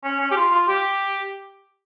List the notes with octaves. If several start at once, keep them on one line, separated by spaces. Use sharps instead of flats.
C#4
C#4
G4
F4
F4
G4